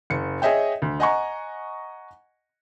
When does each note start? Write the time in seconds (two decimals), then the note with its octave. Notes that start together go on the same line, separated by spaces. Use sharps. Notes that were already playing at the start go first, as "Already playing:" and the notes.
0.10 F#1 C#7
0.42 G#4 C#5 D#5 E5 G5
0.82 D2
1.00 D#5 F#5 G#5 A#5 C#6